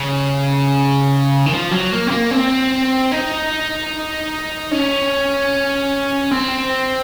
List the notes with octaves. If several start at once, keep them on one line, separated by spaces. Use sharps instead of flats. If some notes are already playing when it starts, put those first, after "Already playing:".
Already playing: C#3
D#3
F3
F#3
A#3
C4
A#3
C4
D#4
C#4
C4